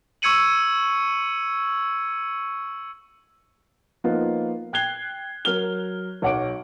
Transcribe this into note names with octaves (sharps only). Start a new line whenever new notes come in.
C#6 E6 G#6 C#7 D#7 F#7
F3 A#3 B3 D#4 F4
G5 F#6 G#6 C7 G7
F#3 A#4 F6 G7
B1 C#5 F#5 D6 D7